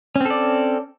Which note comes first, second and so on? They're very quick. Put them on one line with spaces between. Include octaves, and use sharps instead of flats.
C#4 C4 A4 D5